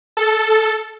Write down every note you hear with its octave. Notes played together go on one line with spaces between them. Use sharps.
A4